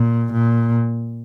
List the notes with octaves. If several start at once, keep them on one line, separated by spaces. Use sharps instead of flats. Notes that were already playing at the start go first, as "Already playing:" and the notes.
Already playing: A#2
A#2